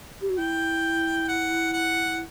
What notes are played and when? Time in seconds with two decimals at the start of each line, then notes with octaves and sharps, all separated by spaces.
0.21 G4
0.29 F#4
0.38 E4 G5
1.28 F#5
1.73 F#5